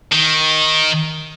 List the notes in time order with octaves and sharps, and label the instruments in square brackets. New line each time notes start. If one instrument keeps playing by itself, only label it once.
[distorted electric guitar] D#3